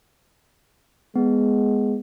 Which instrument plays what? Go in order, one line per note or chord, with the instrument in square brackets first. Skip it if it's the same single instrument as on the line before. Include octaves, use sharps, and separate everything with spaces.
[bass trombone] G#3 [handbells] B3